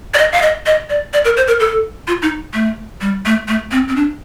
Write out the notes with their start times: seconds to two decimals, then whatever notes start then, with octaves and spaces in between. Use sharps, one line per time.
0.14 D5
0.18 D#5
0.33 F5
0.42 D#5
0.66 D#5
0.90 D5
1.13 D5
1.25 A#4
1.37 C5
1.48 A#4
1.60 A4
2.08 F4
2.22 D#4
2.54 A3
3.01 G3
3.25 A3
3.48 A3
3.72 C4
3.88 C4
3.96 D4